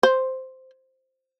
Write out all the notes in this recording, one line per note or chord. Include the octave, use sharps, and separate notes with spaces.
C5